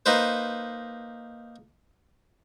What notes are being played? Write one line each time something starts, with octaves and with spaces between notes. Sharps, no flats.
A#3 D#4 B4 C5